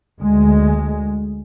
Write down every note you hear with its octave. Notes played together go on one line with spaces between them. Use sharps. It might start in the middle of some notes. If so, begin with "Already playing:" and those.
D2 G#3